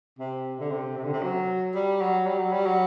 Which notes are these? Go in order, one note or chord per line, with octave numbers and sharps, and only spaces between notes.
C3
D3
C3
C3
D3
C3
F#3
G3
F#3
G3
F#3
G3
F#3